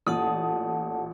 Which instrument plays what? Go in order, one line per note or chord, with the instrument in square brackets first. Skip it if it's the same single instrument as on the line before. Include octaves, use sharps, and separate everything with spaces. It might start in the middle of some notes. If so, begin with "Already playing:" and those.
[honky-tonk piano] A1 A#2 D#6 [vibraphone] A4 F#5 A5